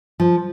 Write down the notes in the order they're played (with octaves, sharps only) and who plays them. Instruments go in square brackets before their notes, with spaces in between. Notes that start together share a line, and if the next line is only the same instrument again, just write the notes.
[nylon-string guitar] F3